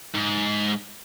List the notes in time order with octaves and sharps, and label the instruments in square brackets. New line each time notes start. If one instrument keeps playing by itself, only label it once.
[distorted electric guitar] G#2